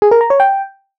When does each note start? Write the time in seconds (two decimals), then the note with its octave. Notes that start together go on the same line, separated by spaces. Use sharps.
0.02 G#4
0.11 A#4
0.21 A#5
0.30 C#5
0.40 G5